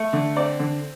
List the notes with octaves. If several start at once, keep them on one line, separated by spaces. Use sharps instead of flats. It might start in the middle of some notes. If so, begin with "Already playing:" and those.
Already playing: A3
D3
C4 D5
D3